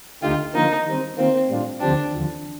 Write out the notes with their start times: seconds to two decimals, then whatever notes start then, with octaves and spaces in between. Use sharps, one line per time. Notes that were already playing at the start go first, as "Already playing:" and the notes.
0.22 D2 D3 A3 D#4 F4 G4
0.54 D3 F3 A#3 D#4 F4
0.86 D#3 G3 C4
1.18 D#3 A#3 C4 F4
1.49 A2 G3 D4 F4
1.80 D2 D3 F3 C4 D4 G4
2.12 D#2 D3 F3